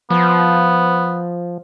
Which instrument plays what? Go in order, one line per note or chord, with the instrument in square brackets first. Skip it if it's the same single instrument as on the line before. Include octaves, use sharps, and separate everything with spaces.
[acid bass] F3 [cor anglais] B3